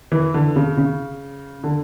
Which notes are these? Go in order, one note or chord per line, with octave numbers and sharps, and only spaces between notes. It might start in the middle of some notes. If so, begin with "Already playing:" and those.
E3
D3
C#3
C#3
D3